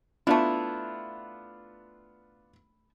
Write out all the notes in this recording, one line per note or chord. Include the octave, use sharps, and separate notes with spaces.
A3 B3 D4 E4 F4